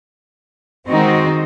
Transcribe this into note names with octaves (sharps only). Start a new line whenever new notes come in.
D#3 G#3 C4 D#4 F#4